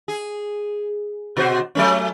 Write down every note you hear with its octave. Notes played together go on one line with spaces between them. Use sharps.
G#4
B2 F#4 C5
F#3 A3 C#4